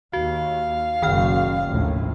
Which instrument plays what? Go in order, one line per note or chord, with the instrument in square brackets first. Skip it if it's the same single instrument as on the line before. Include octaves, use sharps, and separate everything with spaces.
[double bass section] D#2 [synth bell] F#4 [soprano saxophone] F5
[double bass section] F#1 B1 F#2 [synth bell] D#3 G5 F6
[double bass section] A#1 D#2 A2